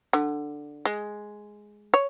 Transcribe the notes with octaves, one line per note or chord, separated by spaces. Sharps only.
D3
G#3
C#5